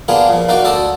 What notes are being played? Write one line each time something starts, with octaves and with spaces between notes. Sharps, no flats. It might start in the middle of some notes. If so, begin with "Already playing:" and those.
A#3 B3 D4 F4 G#4
A#2 F3
A#3 D#4 F#4 D5
D2 D3 A4 D5 D#5 A5